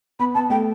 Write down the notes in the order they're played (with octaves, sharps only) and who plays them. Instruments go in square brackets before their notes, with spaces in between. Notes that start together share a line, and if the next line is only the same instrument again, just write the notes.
[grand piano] B3 [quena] B5
[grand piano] B3 [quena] A5
[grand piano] A3 [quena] G5